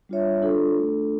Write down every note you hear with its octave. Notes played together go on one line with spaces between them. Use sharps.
G3 D4 F4 C#5 E5
D4 F4 A4
A3 D4 A4